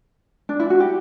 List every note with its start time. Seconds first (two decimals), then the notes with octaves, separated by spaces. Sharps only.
0.49 D4
0.60 E4
0.70 F#4
0.80 G4